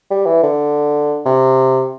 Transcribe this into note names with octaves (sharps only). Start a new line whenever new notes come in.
G3
E3
D3
C3